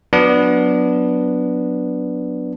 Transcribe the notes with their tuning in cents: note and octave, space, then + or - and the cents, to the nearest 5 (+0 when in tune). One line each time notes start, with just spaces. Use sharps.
F#3 -30 B3 +0 D4 +0